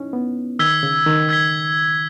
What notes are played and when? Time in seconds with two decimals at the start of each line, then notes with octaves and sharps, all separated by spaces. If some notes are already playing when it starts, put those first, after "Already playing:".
Already playing: C#4 D#4 E4
0.13 B3
0.59 D#3 E6 G#6 B6 G7
0.83 C#3
1.06 D#3
1.29 E6 G#6 B6 G7